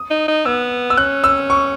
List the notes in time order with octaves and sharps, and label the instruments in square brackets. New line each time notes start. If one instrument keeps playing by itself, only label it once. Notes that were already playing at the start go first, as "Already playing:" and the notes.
Already playing: [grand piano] D#6
[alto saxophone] D#4
D#4
[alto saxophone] B3 [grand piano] E6
[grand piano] E6
[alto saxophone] C#4 [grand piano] F#6
[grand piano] E6
C#6